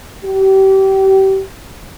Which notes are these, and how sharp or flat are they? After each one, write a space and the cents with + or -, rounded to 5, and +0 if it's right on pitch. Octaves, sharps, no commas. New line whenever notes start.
G4 -30